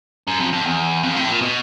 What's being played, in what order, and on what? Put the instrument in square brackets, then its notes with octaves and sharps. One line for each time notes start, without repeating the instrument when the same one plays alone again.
[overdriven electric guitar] F#2
F2
F2
E2
F2
A2
A#2
B2